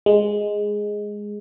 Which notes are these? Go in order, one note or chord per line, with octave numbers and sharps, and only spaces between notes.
G#3